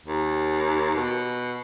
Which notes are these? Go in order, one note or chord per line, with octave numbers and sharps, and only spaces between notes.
D#2
B2